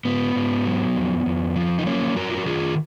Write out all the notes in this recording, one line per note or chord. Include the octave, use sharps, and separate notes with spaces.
G#2 B3
G#2
F#3
F2
F2
F3
D#4
F#3 A#3 C#4
F#2 F#4 A#4
F4
F#4
D#3 F4 G#4